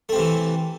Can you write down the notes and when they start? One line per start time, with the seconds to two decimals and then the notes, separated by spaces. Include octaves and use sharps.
0.09 A3
0.12 C4
0.16 C3
0.19 E3